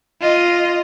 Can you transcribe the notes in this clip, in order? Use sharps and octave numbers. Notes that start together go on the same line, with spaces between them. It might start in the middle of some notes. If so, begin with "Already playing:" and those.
F4 D#5